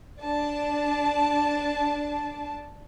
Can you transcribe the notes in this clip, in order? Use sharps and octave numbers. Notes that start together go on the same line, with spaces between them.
D4 D5 A5